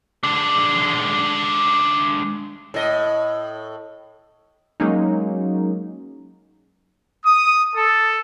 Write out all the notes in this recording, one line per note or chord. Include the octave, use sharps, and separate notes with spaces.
G#3 D4
A2 D#5
F#3 G#3 A#3 C#4 D#4
D#6
A4